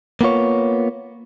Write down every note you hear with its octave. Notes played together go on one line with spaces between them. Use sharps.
A#3 B3 F4 C#5